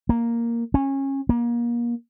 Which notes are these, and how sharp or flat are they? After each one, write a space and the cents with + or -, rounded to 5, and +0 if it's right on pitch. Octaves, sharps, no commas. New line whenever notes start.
A#3 +0
C#4 -25
A#3 +30